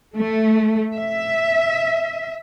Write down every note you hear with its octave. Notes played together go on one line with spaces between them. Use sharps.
A3
E5